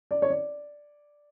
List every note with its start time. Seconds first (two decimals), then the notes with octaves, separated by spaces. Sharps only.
0.11 D5
0.22 C#5
0.30 D5